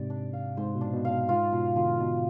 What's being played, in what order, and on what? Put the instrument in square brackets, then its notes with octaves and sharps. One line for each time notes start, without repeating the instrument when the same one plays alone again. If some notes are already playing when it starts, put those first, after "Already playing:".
Already playing: [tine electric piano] G#2 C3 [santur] D5
[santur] D4
F5
[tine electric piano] G#2 [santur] C5
[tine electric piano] B2
[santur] D4
[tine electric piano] B2
[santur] F5
[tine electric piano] B2
[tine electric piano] G#2 [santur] F4
[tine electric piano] B2 [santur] F3
[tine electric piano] B2 D3 [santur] F3
[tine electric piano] G#2
[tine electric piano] B2 [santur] F4